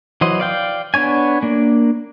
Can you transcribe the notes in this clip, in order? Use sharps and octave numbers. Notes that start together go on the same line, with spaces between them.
E3 F#3 C5 D#5
D5 F5 G5
B3 D4 C#5 G#5
A#3 D4